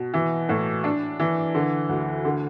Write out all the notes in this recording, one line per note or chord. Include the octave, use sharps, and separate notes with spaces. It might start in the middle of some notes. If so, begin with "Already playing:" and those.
Already playing: B2
E3
A2
D4
E3
D3
D2
D3